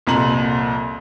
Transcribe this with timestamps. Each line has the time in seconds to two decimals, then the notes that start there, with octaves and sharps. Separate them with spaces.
0.07 C2 F2 A#2 A#5 C6 F#7